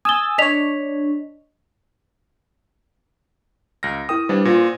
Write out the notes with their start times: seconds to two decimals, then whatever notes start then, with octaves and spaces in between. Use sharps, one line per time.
0.05 G#5 D#6 E6 A6 G7
0.38 D4 C#5 D#5 B6 F7
3.83 C#2 F6 A#6
4.09 E4 A#4 G5 D#6
4.29 G3 D4 B4 C5
4.45 A#2 F4 C5 A#6